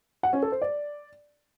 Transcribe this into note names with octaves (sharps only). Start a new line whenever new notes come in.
F#5
C#4
A4
C5
D5